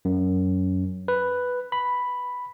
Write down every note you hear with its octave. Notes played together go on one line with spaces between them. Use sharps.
F#2
B4
B5